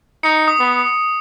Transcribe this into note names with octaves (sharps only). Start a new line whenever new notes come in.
D#4 C#7
D#6
B3